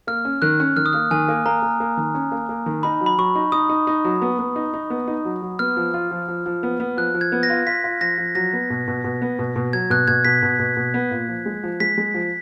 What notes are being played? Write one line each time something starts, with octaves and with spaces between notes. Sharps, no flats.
A#3 F6
C#4
D#3 F#6
C#4
D#3 F6
D#6
A#3 F6
D#3 G#5
A#3
A#3 A#5
A#3
A#3
D#3
C#4
A#3
A#3
D#3
D#4 B5
F#3
B5
F#3 C#6
D#4
D#4 D#6
D#4
D#4
F#3
B3
B3
D#4
D#4
B3
D#4
F#3
F#3
B3 F6
F3
F4
F3
F3
F3
B3
B3
F3 F#6
F3
G#6
B3
A#6
F4
F4 B6
F4
F3 A#6
F3
F#3 A#6
B3
B2
B2
B2
B3
B2
B2
F#3 G#6
B2 F#6
B2 G#6
B2 B6
B2
B2
B2
B3
A#2
F3
G#3
F3
G#3 B6
G#3
F3